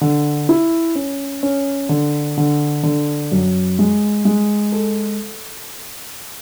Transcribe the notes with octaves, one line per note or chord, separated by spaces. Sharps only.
D3
E4
C#4
C#4
D3
D3
D3
F#2
G#3
G#3
A4